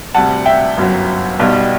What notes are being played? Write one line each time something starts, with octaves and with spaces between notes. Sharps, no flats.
D2 C3 G3 F#5 A5
E5 G5
G1 F#2 F#3
B1 B2 G3